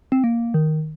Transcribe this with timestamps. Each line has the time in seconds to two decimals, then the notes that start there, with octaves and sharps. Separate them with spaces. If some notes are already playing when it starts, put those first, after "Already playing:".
0.12 C4
0.24 A#3
0.54 D#3